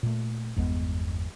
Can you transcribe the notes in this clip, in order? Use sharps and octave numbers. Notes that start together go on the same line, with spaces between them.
A#2 A3
G1 E2 G#3 B3